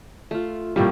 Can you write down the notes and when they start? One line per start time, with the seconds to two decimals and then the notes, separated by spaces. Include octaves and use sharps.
0.31 A3 F4
0.76 A2 F3 G3 A#3 C4